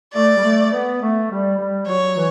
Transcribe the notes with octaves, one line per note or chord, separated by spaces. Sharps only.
A3 D5
G3
A3
B3
A3
G3
G3
F#3 C#5
E3